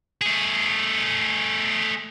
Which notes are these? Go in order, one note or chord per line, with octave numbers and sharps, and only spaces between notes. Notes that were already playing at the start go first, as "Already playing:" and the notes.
A3 G#4